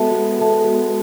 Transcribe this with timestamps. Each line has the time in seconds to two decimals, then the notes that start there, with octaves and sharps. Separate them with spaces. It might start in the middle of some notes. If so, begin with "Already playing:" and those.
Already playing: G#3 B3 F#4 A4 E5 A5
0.11 F#4
0.39 A4 E5 A5
0.64 G#3 B3 F#4